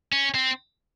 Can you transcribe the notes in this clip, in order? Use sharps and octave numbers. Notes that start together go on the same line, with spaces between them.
C#4
C4